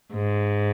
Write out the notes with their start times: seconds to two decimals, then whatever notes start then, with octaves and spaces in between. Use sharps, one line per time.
0.13 G#2